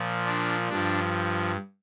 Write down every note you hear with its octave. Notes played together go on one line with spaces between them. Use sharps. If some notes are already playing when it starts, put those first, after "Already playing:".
Already playing: A#2 F3
D4
G2 F3 D4